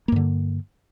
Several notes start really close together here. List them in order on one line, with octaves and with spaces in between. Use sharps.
A#3 G2 D3